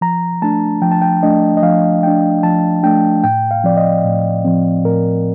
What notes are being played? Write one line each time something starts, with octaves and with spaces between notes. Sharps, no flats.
F3 A#5
A3 D4 A5
F3 G5
A5
G5
A3 D4 D#5
D#5
F3 F5
A3 D4 G5
F3 A5
A3 D4 G5
A2 G5
F5
F3 C4 D5
D#5
A2
F3 C4
A2 A#4